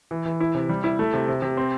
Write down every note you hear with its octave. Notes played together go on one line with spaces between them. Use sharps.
E3
E3
E4
C3
G3
E4
A3
C3
C3
C3
C4